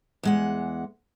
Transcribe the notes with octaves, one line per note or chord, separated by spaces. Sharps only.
E2 G#3 F#5